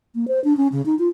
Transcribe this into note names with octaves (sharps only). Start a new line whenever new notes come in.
A#3
C5
D4
C#4
C#3
D#4
F4